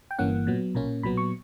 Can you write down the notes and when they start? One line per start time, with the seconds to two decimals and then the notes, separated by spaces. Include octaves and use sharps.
0.11 G5
0.19 G1 G2 E3 A#3 C#4 F#5
0.47 A#2 F#3 B3
0.75 B1 A#2 A#3 C#4
1.03 B1 A#2 F#3 B3 B5
1.17 C#6